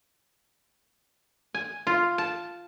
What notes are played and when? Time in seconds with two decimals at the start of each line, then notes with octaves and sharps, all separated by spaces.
1.54 G#5
1.87 F4
2.18 A5